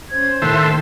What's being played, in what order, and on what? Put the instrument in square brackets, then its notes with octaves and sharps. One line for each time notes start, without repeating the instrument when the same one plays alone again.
[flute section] C#4 C5 G#6
[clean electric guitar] A2 D#3 [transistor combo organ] A4 C5 E5 [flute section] F#6